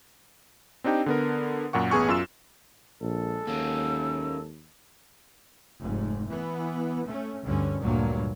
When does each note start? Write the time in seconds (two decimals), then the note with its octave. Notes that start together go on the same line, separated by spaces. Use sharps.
0.84 C4 D4 D#4 G4 G5
1.06 D3 B3 A#4
1.73 F#2 A#2 F#5 C#6
1.91 A1 B3 G#4 G#5 C#6
2.08 F#2 F4 E6 E7
3.01 A#1 G#3 A4
3.47 D#2 A#3 C#4 E6
5.80 F1 G#2
6.30 E3 B3
7.07 A3 C#4
7.44 D2 G2 D3 C#4
7.80 D2 G2 A#2 F#3 A#3